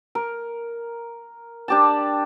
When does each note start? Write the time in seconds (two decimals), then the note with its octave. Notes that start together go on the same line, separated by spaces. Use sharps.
0.15 A#4
1.68 D4 G4 A5